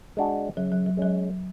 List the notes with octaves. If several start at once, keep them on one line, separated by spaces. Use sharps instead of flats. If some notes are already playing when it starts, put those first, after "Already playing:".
G#3 D4 F#4
C#3 F#3
F#3
F#3
F#3 G#3 C#4